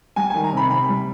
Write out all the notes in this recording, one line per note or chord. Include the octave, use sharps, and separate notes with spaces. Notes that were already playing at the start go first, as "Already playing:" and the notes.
G3 G#5
G#5
D#3
A#5
C3 B5
C3 B5
G3